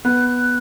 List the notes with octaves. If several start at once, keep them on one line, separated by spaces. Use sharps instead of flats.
B3 F#6